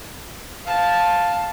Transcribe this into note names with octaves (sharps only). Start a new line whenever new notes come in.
F5 A5